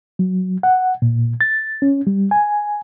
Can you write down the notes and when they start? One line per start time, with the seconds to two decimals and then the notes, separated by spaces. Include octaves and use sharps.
0.19 F#3
0.63 F#5
1.02 A#2
1.41 A6
1.82 C#4
2.07 G3
2.31 G#5